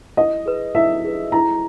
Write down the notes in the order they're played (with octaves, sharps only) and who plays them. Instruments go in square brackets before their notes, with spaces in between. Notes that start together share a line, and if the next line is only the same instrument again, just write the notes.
[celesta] E4 [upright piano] D#5
[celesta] G#4 B4
[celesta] E4 [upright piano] E5
[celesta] G#4 B4
[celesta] E4 [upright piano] A#5